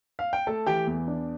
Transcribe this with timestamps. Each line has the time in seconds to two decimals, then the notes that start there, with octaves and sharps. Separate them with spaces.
0.19 F5
0.33 G5
0.47 A3 A4 A5
0.66 E3 G4 G5
0.87 E2
1.07 D4